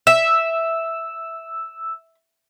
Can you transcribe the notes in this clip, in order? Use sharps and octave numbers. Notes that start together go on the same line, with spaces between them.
E5 E6